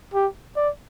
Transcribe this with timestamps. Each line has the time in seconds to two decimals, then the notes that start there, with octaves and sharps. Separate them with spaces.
0.14 G4
0.56 D5